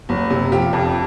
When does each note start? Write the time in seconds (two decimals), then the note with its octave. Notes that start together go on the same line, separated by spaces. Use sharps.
0.09 F#1
0.30 C3
0.52 F3 G4
0.73 F2